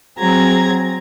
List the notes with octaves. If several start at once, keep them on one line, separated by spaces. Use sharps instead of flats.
F#3 C4 G#4 A#5 G#6